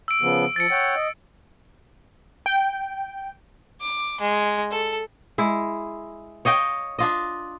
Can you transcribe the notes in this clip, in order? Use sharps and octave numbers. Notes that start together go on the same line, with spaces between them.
E6 D7
C#3 F3 B3
F3 A6 C#7
C#5 F#5 G5
D#5
G5
D6
G#3
A4
G#3 E4
C#5 D#5 F5 G5
D4 F4 D#5